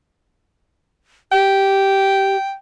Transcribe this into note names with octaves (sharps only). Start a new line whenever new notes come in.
G4 G5